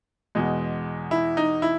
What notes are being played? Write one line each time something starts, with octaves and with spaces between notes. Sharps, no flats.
E2 B2 G#3
E4
D#4
E4